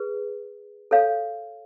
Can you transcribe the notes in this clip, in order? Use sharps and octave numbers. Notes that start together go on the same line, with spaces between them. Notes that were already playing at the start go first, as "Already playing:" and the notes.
Already playing: G#4 B4
A4 C#5 F5